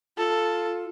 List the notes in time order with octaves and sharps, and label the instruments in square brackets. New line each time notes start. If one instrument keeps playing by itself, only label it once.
[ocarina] F4 [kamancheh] A4